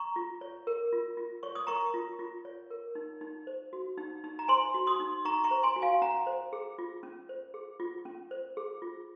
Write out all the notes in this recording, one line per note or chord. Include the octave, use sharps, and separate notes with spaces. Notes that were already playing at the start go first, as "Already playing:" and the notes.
Already playing: A#5 C#6
F4
C#5
A#4
F4
F4
C#5 C#6
D#6
A#4 A#5 C#6
F4
F4
C#5
A#4
D#4
D#4
C5
F#4
D#4
D#4
A#5
C5 G#5 C6
F#4
C6 D#6
D#4
D#4 A#5 C#6
A#5 C#6
C5
G#5 C6
F#4
F5 G#5
C#4 F#5 A#5
C5
G#4
F4
C#4
C5
G#4
F4
C#4
C5
G#4
F4